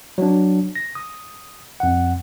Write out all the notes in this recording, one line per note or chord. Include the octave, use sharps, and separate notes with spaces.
F#3 D4
A#6
D#6
F2 F#5